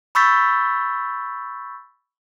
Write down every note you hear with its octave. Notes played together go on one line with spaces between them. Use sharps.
B5 C#6 E6 G6 A6 B6